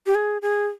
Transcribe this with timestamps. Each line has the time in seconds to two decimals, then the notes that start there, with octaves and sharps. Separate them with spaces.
0.06 G4
0.15 G#4
0.42 G#4